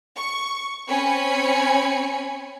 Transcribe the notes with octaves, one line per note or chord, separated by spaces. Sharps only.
C#6
C4 C#4 C#5 G#5 B5 C#7